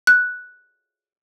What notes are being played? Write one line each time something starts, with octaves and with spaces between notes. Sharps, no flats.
F#6